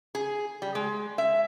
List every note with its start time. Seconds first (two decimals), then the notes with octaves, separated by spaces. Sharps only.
0.15 G#4
0.62 G3
0.75 G#3
1.18 E5